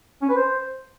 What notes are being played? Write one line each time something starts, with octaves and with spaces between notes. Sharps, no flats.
C#4
B4
C5